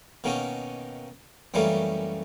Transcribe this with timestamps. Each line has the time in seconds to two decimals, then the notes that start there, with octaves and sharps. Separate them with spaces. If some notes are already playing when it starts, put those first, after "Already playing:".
0.24 B2 D#3 A#3 C#4 D#4 F#4
1.54 F#2 E3 G3 A3 A#3 C#4